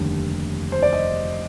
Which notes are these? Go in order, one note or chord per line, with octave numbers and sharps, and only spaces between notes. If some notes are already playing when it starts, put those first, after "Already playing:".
Already playing: F1 D#2 D3 G3 A#3
C5
D5
D#5